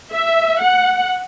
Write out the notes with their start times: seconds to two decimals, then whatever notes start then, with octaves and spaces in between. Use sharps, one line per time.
0.13 E5
0.61 F#5